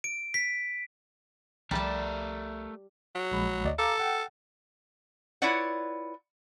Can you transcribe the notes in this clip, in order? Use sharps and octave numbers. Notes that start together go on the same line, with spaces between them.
D7
B6
C2 F3 G3 A3 A#4 A5
F#3
A#1 G#3 B5
D2 D5 D#5
A4 F5 A#5 D6
F#5 G5
E4 F4 B4 C#5 D5 F#5